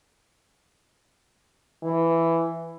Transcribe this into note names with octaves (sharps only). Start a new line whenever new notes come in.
E3